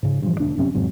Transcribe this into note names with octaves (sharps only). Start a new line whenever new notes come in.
G#2 C#3
G2 A#2 E3 F3
E1 D2 D4
G1 F#2 C3 C#4
E2 G#2 C3 F#3